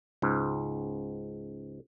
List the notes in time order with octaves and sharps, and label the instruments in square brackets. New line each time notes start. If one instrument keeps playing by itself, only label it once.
[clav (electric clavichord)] C#2 G#2